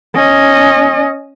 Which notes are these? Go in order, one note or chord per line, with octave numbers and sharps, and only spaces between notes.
C#4 D#5